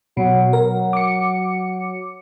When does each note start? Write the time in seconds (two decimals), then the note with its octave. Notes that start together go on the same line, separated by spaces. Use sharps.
0.17 B2 F#3
0.53 F#3 A#4
0.93 D6 C#7